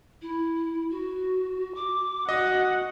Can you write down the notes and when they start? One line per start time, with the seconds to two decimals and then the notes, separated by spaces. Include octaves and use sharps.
0.22 E4
0.90 F#4
1.75 D6
2.29 F#4 D#5 F#5